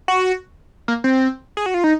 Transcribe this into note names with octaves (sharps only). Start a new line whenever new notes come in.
F#4
A#3
C4
G#4
F#4
F4
D#4